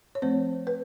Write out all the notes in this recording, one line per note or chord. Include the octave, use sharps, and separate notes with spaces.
C#5
F3 A3 C4 C5
B4